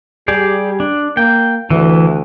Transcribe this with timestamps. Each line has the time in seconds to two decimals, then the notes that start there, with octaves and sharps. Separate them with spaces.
0.28 G3 G4 G#4 D5
0.80 D4
1.17 A#3 G5
1.70 D2 E3